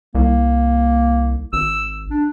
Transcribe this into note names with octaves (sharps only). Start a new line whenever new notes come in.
C2 A#3
G#1 E6
D4